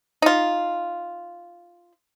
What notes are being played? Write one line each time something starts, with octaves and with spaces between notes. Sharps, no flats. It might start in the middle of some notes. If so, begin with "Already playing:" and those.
D#4 F4